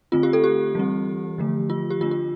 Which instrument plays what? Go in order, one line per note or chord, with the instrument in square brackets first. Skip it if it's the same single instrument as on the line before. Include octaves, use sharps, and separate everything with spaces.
[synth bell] D3 A3 C4 F4
G4
A4
G4
E3 G3 C4
D3 F3 A3
F4
G4
D3 A3 D4 F4
F4